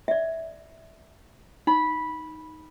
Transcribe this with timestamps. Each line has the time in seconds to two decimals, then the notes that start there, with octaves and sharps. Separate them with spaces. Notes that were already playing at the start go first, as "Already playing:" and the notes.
0.08 D5 E5
1.67 D#4 B5